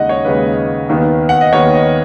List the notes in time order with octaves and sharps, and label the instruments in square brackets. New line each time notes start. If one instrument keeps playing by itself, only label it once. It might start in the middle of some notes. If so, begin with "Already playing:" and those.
Already playing: [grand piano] D#2 C#3 G#3 D#4 D#5 F#5
C#5
D#2 C#3 G#3 D#4 B4
D#2 D#3 B3
F#5
D#5
D#2 D#3 B3 C#5
D#5